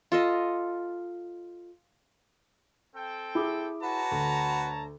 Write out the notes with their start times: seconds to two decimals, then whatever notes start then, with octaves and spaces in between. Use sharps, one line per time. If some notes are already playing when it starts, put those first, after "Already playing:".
0.12 F4 A4 D#5
2.94 C4 A4 G5
3.35 E4 G#4 D6
3.83 F#4 B4 C#5 A5 A#5
4.11 D2